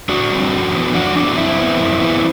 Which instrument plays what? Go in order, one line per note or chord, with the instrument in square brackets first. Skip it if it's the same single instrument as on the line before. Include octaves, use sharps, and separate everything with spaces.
[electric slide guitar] A2 D4 F#4
G3 C4
F#2
E3 B3
F#2 D4 F#4
E3 B3 D4
F#4
F#2 C4 E4
E3 B3
F#2
E3 B3